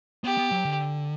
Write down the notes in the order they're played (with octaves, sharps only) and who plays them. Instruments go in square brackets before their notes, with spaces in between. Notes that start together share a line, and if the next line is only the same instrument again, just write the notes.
[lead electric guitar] B3 [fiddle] G4
[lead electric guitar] B3
F#3
D3